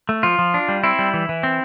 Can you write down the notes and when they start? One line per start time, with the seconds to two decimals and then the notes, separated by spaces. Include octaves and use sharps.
0.09 A3
0.23 F3 F4
0.39 F3
0.54 D4
0.69 G3
0.84 C4 E4
0.99 G3
1.14 E3
1.29 E3
1.43 C4